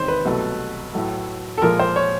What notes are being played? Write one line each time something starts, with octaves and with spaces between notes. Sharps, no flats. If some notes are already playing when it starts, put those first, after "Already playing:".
Already playing: E2 C3 D#3 G#3 C5 C#5
B4
C2 B2 F#3 A3
A2 F#3 A3
A4
A#2 F3 G#3 A#4
C5
C#5